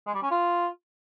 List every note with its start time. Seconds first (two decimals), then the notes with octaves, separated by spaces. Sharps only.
0.06 G#3
0.14 G3
0.23 C#4
0.31 F4